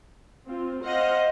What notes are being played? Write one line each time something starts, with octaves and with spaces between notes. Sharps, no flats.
C4 F4
C5 D#5 F5 F#5